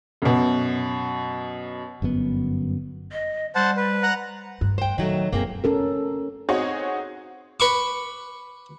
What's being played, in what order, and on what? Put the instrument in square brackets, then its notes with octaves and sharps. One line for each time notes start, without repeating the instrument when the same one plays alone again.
[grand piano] F#2 B2
[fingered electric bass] G1 F#2 B2 B3
[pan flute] D#5
[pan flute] G3 [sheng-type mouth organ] C5 F#5 A5
[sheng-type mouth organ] B4
F#5 A#5 F#6
[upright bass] G2
[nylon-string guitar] C5 G5
[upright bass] A#2 [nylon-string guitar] D#3 F#3 A3
[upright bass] F#2 A#2 [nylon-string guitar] A#3 C4 G#4
[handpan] C#4 A4 A#4
[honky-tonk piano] C4 D#4 F#4 G#4 C#5
[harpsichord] B4 C#6 D6